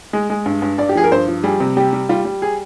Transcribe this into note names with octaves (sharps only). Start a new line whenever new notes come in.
G#3
G#3
G2
G2
G2 D5
G4
F3 G#4
A#4
G2 C5
F3
G3 G#4
C3
G3 G4
G3
G3 F4
G3
G#4